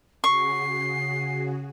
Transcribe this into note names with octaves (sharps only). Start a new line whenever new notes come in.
C#3 F#4 G#4 C#6 C7